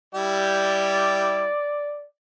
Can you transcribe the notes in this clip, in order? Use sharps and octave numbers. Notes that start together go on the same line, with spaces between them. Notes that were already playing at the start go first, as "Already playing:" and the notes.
G3 E4 G4 D5